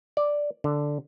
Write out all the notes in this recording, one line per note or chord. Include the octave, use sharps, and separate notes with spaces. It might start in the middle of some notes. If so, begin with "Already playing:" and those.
D5
D3